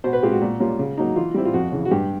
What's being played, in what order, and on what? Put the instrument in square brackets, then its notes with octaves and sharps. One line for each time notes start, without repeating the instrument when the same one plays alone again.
[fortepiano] B2 C5
B4
G#3 C4 F4 G4
F#4
A#2
G3 A#3 C#4 F4
C#3
F#3 A#3 D#4
E3 F4
G3 C4 E4
F4
F2 F#4
C#3 E3
F#4
G2 G4